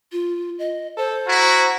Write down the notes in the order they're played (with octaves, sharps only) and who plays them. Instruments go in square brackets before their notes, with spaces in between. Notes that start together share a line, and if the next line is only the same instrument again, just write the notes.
[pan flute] F4
D#5
[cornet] A4 [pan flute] C5
[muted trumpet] E4 [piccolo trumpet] F#4 [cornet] A#5